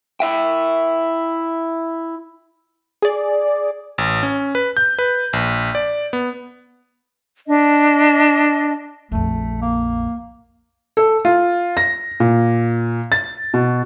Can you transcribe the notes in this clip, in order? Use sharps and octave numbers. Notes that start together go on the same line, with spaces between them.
E4 E5 G5
G#4 D5
A1
C#4
B4
G6
B4
A#1
D5
B3
D4 D#5
A#1 F2 A3
A#3
A4
F4
A#6
A#2
A6
B2